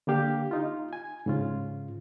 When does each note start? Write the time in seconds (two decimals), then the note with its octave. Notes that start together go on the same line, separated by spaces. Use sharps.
0.07 D3 A#3 G4 F5
0.51 D#4 F4
0.93 G#5
1.26 G#2 C#3 F4